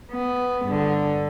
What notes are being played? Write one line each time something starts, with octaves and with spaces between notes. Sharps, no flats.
B3
G2 D3